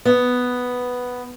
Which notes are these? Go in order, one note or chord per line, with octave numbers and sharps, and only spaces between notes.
B3